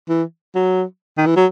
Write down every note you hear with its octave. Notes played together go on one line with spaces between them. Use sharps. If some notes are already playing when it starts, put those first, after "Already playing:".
E3
F#3
D#3
E3
F#3